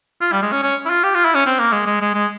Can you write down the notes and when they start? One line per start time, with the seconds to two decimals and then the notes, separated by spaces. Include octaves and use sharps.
0.21 F4
0.32 G3
0.43 G#3
0.52 C#4
0.63 C#4
0.86 E4
0.90 F4
1.04 G4
1.15 F4
1.25 E4
1.35 C#4
1.46 C4
1.59 A#3
1.73 G#3
1.86 G#3
2.01 G#3
2.15 G#3